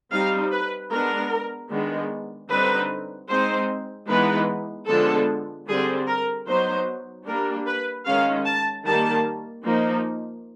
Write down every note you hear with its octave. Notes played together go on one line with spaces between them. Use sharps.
G3 C4 D#4 F5
B4
G#3 B3 D4 A#4
D#3 G#3 B3 D4
D3 G3 C4 D#4 B4
G#3 C4 D#4 C5
E3 G#3 B3 D#4 B4
D3 F3 G#3 B3 D4 A4
D3 G3 C4 G#4
A#4
F#3 B3 D#4 C5
G3 A#3 D4 A#4
B4
D#3 G#3 C#4 F5
A5
D#3 G3 A#3 A5
F3 A#3 D#4